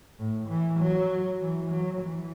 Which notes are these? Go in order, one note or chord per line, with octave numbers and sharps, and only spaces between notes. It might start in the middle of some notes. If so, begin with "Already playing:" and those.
A2
E3
F#3
E3
F#3
E3